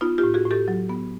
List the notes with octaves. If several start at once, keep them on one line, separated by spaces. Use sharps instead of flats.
B3 D#4 F4
F4 G4
A2
F#4 G#4
A2
G4 A4
F#3
B3